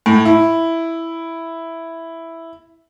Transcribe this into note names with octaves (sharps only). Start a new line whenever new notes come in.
A2
E4